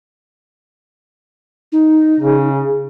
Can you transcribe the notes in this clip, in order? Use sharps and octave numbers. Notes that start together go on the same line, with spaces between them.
D#4
C#3